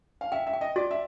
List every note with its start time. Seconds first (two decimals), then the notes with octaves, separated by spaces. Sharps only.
0.21 F5
0.32 E5 G5
0.47 E5
0.54 G5
0.61 D#5
0.76 F#4 D5
0.91 E5